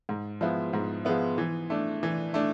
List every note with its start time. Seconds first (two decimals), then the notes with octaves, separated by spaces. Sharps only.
0.09 G#2
0.41 F3 G#3 B3 E4
0.73 G#2
1.05 F3 G#3 B3 E4
1.38 E3
1.70 A3 D4
2.03 E3
2.34 A3 D4